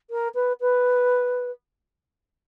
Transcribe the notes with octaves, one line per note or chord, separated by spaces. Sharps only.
A#4
B4
B4